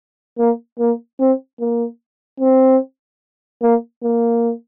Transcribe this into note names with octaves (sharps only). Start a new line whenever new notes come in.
A#3
A#3
C4
A#3
C4
A#3
A#3